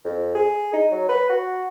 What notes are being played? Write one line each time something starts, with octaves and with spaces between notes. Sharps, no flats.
F2
G#4
D#4
F#3
B4
F#4